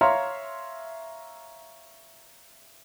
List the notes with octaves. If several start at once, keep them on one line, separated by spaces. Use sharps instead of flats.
C#5 E5 F5 A#5 C6 F6